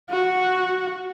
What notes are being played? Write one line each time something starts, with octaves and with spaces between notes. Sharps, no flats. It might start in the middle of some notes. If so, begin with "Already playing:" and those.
F#4